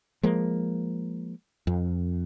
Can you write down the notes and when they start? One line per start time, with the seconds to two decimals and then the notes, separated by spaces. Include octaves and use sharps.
0.23 F3 G#3 A#3
1.67 F2